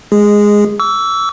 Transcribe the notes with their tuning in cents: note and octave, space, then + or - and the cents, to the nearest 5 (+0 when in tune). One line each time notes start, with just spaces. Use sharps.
G#3 +0 G#4 -10
C#6 +45 E6 +0